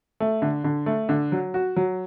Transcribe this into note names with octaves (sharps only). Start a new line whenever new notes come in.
A3
D3
D3
A3
D3
F#3
F#4
F#3